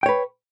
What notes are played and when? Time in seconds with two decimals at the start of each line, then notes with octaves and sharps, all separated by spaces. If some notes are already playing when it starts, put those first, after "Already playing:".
0.03 G5
0.06 C#5
0.09 B4